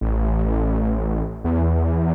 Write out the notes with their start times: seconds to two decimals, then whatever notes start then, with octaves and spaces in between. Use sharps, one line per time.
0.01 A1
1.44 E2